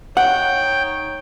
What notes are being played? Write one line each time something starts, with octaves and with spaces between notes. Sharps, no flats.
D#4 C#5 F#5 G5